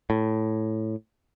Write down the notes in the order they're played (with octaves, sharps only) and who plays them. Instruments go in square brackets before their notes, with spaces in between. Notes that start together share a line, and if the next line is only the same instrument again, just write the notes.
[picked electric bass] A2